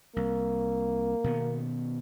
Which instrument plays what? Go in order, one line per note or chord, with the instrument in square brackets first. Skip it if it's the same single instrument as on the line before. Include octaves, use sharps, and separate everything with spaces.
[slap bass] C2 [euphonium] A#3
[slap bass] B2 D#3 B3